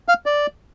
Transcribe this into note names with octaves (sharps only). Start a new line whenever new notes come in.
F5
D5